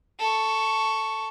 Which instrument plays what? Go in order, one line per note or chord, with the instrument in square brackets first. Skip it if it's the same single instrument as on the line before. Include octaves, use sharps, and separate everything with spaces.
[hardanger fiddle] A4 C#6